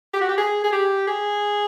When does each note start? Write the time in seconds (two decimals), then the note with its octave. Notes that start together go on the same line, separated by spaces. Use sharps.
0.14 G4
0.21 F#4
0.29 G4
0.38 G#4
0.64 G#4
0.72 G4
1.07 G#4